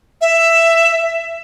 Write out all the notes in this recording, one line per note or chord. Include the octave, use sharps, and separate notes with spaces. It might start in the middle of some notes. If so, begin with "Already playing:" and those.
E5